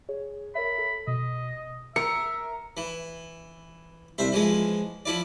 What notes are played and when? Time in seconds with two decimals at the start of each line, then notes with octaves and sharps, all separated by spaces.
0.09 G#4 C#5
0.55 A#4 C#5 E5 B5
0.78 A4
1.07 B2 D#5
1.96 A#4 E5 C#7
2.77 E3
4.18 C2 C5 E5
4.32 E3 F3 G#3
5.06 F3 E4 D5